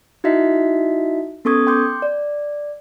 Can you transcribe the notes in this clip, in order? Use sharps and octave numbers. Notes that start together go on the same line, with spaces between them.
D#4 E4 F#4 D#5 E5 B6
B3 C#4 A4 C#6 D#6 G#6
G5 C6 D6 G6
D5